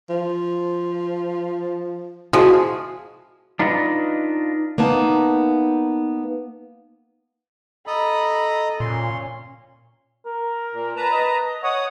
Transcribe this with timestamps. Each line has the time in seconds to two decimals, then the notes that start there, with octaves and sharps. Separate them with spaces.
0.09 F3
2.33 F3 G#3 E4 F#4 G#4
3.59 D4 D#4 F4 B4 D5 D#5
4.78 A#3 B3 D#4 A5
7.87 A4 D#5 A#5 B5 D#6
8.80 A#2 C#4 C6
10.26 A#4
10.72 A#2
10.96 B4 A5 A#5
11.13 D#5
11.63 C#5 F#5 D#6